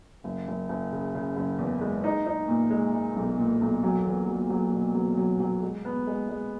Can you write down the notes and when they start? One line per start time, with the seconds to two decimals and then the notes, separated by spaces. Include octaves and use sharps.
0.24 F#1
0.48 F#1
0.69 F#1
0.93 C#3
1.15 C#3
1.36 F#1
1.59 E2
1.81 G#3
2.04 D#4
2.27 D#4
2.48 A#2
2.71 G#3
2.93 G#3
3.16 B1
3.38 A#2
3.61 B1
3.84 F#3
4.06 E2
4.28 F#3
4.50 F#3
4.72 B2
4.95 F#3
5.17 F#3
5.40 F#3
5.62 G#3
5.85 B3
6.07 G#3
6.29 G#3